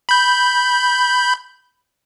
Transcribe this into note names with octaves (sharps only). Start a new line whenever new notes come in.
B5 G6